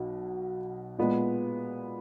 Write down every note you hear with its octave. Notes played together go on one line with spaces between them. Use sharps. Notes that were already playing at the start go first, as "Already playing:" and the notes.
Already playing: B1 B2
A#2 G#3 B3